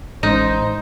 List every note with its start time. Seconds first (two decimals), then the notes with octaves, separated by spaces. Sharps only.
0.23 A1 G#3 C#4 D#4 C5